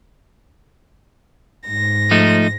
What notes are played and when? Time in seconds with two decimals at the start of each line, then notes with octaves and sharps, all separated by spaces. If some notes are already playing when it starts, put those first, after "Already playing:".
1.67 G#2 A#6
2.11 F3 A3 D#4